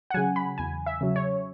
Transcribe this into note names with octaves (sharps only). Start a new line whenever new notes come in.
F#5
C#3 F#3 G#5
B5
E2 G#5
E5
C#3 F#3
C#5